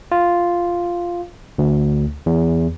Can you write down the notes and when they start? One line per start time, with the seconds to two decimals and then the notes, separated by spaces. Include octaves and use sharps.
0.12 F4
1.58 D2
2.26 E2